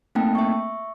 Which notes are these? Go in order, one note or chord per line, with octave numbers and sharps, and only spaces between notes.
A3 A#3 C4 D#4 G5 A5
E5 C#6